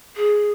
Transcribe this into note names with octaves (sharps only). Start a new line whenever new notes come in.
G#4